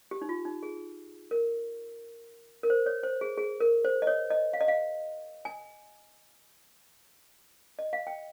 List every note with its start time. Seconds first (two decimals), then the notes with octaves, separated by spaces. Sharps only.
0.11 G4
0.22 D#4
0.29 F4
0.45 D#4
0.63 G#4
1.31 A#4
2.63 A#4
2.70 C5
2.86 C#5
3.03 C5
3.21 G#4
3.38 G#4
3.60 A#4
3.85 C5
4.02 D#5
4.07 C#5
4.30 D#5
4.53 F5
4.61 D#5
4.68 F5
5.45 G#5
7.79 D#5
7.93 F5
8.07 G5